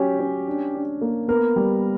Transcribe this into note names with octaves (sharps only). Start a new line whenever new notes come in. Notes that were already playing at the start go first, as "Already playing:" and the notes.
Already playing: F#3 C#4 G4
C#4
D4
D4
A#3
B3 A#4
G3